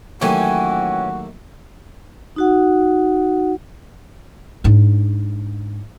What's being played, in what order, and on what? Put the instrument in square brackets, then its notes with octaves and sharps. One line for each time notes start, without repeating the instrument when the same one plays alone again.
[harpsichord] D#2 F#3 A3 [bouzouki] E3 C#4 [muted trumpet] F#4 [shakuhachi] G5
[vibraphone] D#4 F#4 F#5
[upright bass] G#2 D4